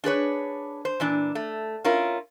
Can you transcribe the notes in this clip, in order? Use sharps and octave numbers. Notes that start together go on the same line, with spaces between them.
D4 G#4 B4 C#5
C5
A#2 E3 D4
A3
C#4 E4 F4 A#4